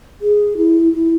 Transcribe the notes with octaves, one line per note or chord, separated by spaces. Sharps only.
G#4
E4
E4